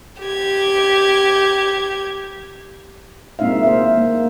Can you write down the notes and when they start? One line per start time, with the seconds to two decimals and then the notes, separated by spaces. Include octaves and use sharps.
0.22 G4 G#6
3.39 G#3 A#3 C4 D#4 E5 F5
3.63 C5 E5
3.97 A#3